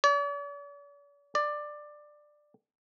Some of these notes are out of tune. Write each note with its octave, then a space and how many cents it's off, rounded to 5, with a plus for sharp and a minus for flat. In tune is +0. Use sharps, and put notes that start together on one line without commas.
D5 -45
D5 +15